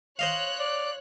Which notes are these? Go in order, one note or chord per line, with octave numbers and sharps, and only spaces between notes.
C5 C#5 D#5 F5 F#6
D5